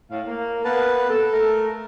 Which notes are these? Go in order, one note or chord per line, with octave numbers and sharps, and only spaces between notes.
A2 F5
A#3
A#3 B3 B4 A5
A4
A3 A#4